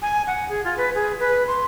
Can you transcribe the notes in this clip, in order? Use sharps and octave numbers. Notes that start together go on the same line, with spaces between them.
G#5
F#5
G#4
F4
B4
G#4
B4
C6